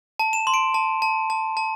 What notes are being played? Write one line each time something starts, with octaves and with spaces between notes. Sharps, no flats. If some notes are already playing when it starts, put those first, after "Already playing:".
A5
E7
C6
D7
A5
A5
A5
A5